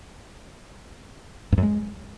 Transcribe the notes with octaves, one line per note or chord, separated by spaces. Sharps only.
G2
F#2
G#3